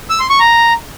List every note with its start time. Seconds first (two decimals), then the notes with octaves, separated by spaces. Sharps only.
0.10 E6
0.20 C6
0.30 C#6
0.40 A#5